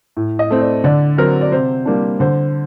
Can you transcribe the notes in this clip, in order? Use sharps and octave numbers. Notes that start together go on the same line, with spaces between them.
A2
D#5
A3 C4
D5
D3 D5
F#3 C4 A#4
D5
C3 C5
G3 A#3 D4
D3 C5